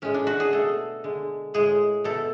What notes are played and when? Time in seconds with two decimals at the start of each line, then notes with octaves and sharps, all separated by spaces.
0.02 A2 G#3 C#4
0.14 D4
0.27 F#4
0.40 G#4
0.52 B2 A3 A4
1.04 D3 G#3
1.54 A2 G#3 G#4
2.04 B2 A3 A4